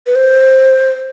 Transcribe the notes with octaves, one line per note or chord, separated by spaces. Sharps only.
B4
C5